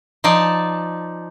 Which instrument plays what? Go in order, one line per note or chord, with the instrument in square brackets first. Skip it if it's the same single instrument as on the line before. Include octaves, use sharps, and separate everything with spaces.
[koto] F3 D#4 D5 A5